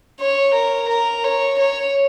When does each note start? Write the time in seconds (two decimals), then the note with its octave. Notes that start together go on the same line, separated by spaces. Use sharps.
0.20 C#5
0.55 A#4
0.89 A#4
1.24 C#5
1.59 C#5